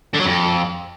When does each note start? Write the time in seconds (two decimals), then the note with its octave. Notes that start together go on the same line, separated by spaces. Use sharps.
0.14 D3
0.20 F#3
0.26 F2